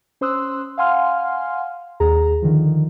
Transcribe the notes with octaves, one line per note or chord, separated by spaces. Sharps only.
C#4 C5 C6 D#6 E6 F#6
F5 F#5 G#5 C6 F6
D#2 G#4 A#5
D3 D#3 F3